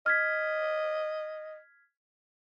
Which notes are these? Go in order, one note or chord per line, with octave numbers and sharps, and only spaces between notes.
D#5 F6 G#6 B6